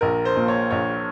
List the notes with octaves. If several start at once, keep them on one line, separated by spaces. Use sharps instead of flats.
A#1 A#4
C5
A#2
C#5
A#1 C#5